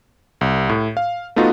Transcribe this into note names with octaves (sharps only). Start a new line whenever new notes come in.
C2
A2
F5
A3 B3 D#4 F4 F#4